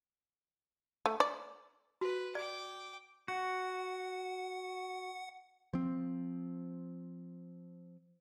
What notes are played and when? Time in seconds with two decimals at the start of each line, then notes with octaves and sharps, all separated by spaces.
1.06 A3
1.20 D5
2.01 F#4 B4
2.35 D5 G5 D6
3.28 F#4 F#5
5.73 F3 C4